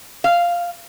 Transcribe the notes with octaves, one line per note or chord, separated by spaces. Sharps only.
F5